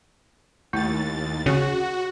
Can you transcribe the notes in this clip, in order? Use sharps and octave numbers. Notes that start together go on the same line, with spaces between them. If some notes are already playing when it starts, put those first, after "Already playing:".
D#2 A3 E4 A6
C#3 F#4